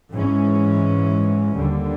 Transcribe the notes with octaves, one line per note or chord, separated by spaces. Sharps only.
G#2 E3 G#3 C#4
D#2 D3 G3